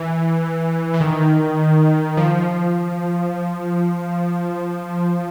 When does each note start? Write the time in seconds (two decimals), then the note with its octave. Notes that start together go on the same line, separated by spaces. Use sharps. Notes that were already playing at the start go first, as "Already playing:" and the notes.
Already playing: E3
0.94 E3
1.01 D#3
2.17 F3
2.41 F3